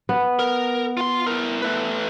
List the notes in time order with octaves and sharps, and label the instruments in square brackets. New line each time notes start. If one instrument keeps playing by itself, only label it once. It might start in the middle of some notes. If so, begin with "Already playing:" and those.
[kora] B3
[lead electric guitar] A#4
F4 C6
E4 A#4
A3 B4